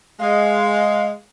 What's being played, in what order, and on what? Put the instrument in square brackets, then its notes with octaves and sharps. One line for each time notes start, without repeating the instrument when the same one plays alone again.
[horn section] G#3 [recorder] F5